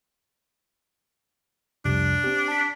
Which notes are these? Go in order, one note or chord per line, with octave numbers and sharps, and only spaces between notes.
C2 F2 C3 D4
C4 G4
A5 B6